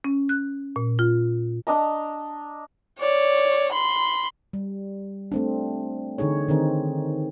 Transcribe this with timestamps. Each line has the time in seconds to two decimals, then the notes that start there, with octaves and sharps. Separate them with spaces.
0.04 C#4
0.29 F#6
0.76 A#2
0.99 F4
1.67 D4 D#5 A#5
2.99 C#5 D5
3.72 B5 C6
4.53 G3
5.32 A3 C4 D4
6.18 D3 E3 D#4 G#4 C#5
6.48 D3 D#3 C4 D#4 G#4